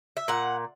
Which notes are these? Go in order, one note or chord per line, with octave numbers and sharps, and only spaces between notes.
E5
A#2 F#5